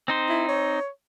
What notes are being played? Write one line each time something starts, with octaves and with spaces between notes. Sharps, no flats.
C4 D#4 C5
E4
C#5